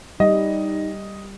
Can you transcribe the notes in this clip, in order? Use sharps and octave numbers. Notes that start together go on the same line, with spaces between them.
G3 D#4 D#5